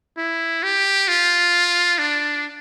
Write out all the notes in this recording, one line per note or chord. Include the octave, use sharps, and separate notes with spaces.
E4
G4
F4
D4